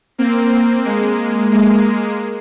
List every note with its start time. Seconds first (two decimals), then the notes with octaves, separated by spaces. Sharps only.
0.18 A#3 C4
0.84 G#3 A#3
1.51 G#3 A#3